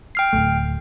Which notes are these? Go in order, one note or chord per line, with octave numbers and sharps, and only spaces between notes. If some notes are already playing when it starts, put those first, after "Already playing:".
G5 F6 C7
D1 F2 A3